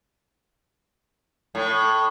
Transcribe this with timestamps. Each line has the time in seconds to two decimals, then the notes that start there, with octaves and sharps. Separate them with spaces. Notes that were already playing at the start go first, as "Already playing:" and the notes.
1.55 A2